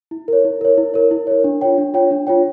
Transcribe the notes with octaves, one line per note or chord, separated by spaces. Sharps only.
E4
A#4 C#5
E4
A#4 C#5
E4
A#4 C#5
E4
A#4 C#5
D4
F4 C#5 G5
D4
F4 C#5 G5
D4
F4 C#5 G5